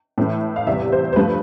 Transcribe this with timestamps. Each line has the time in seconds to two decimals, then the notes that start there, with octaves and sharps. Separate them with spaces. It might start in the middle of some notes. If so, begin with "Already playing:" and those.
0.18 A2 E3 A3
0.56 F5
0.67 E2 C3 G3 E5
0.92 C5
1.13 C5
1.16 G2 F3 A3 B4